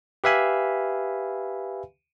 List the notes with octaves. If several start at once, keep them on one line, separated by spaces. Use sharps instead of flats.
G4 B4 E5 F5 G#5 B5